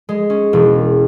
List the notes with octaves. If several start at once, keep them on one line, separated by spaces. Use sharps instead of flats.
G#3
C#4
E1